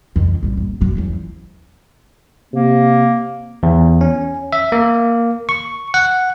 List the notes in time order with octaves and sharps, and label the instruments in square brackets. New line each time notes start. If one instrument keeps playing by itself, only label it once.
[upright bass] F2 D#3
A1 G3
D#2
F#2 F#3
E2 F3
[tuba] C3 [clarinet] A#3
[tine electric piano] E2
C#4
E5
A#3
C#6
F#5